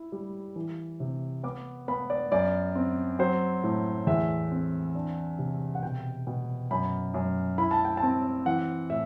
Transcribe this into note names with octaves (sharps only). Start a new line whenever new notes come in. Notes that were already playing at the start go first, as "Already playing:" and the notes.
Already playing: E4
G3
E3
C3
B3 D6
B3 B5
D5
F#2 D5
C4
F#3 C5
A2
E2 E5
C4
D4
C3
F#5
B2 G5
B2
F#2 B5
F#2
E4 B5
A5
G5
A5
C4
E3 F#5
A2 E5